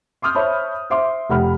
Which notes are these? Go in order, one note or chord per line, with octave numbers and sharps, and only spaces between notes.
C6 D6 D#6 F6 G6
C5 C#5 E5 A5 B5
C5 E5 C6 D6
F1 G4 F#5 B5 F6